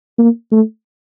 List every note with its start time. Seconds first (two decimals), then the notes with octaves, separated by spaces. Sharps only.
0.19 A#3
0.52 A3